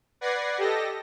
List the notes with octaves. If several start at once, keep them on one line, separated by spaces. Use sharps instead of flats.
B4 D5 F#5 G#6 A#6 C7
G4 A4 D#5 A#6